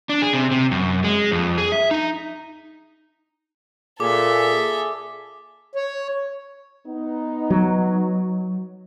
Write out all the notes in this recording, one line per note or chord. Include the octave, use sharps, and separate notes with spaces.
D4
G#4
C3
C3
F#2
G#3
F2
G#4
E5
D#4
A#2 G#4 A4 E5 D6
C#5
B3 D#4
F#3